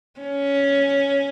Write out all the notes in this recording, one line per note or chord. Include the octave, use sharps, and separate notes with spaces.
C#4